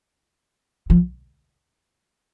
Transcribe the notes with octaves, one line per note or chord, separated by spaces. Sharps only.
F3